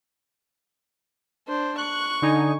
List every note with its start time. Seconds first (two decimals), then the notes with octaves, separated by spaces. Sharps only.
1.48 D4 C5
1.78 C#6 F#6
2.22 D3 D#4 G#5